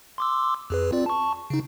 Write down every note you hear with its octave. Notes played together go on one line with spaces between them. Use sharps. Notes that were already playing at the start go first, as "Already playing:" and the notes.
C6 D6 E6
F2 G#4 B4
C4 F4 D5
A5 C#6
C#3 D#4